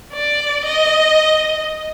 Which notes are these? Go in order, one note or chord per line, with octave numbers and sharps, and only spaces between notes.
D5
D#5